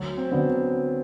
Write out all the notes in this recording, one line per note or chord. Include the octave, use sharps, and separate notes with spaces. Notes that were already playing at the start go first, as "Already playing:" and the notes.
Already playing: D2 F#3
C4
D3 F#3 B3